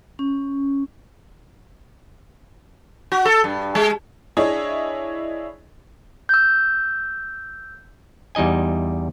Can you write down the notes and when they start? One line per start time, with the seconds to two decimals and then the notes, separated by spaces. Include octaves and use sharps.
0.19 C#4
3.12 F#4
3.25 A4
3.44 G2
3.75 G#3
4.37 D4 E4 G#4 C#5 D#5
6.29 E6 G6
8.35 E2 G3 D#4 D#5 G#5